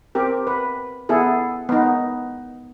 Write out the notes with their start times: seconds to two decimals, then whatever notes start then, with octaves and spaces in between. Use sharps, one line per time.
0.15 C4 G4 A#4
0.47 B4
1.09 B3 E4 G#4 A4
1.69 B3 D#4